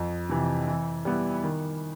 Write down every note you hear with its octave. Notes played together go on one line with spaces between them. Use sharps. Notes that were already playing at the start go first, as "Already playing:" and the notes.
Already playing: F2
C3 E3
E3
G3 B3 E4
D#3